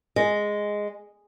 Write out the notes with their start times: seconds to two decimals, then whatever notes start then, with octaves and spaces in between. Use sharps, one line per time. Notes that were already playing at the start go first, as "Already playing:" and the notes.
0.16 G#3